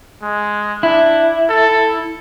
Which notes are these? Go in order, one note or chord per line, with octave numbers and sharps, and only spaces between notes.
G#3
D4 E4
A4